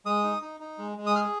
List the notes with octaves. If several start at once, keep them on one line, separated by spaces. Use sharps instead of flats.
G#3 D#6
D#4
D#4
D#4
G#3
G#3
D#6
G#4 F6